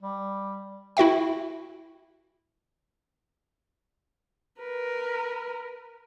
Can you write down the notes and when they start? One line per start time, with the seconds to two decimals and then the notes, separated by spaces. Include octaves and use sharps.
0.02 G3
0.97 E4 F#4 E5 G5
4.59 A#4 B4